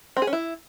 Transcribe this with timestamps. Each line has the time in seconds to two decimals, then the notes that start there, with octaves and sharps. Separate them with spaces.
0.17 C4
0.22 G#4
0.27 C#4
0.33 E4